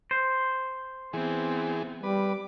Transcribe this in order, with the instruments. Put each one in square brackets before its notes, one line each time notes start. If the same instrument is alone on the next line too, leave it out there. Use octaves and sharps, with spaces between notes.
[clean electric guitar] C5
[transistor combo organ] E3 G#4 [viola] B3 C4
[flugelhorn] G3 [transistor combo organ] B4 [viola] D6